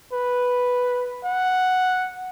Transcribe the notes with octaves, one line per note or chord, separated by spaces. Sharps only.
B4
F#5